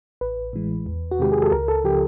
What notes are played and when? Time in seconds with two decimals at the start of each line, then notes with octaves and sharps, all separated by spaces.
0.21 A1 B4
0.53 A2 E3 G#3
0.86 E2
1.11 F#4
1.19 C3 D#3 G#3 G4
1.32 G#4
1.42 A4
1.52 C#2 A#4
1.68 A4
1.84 C#3 F3 G4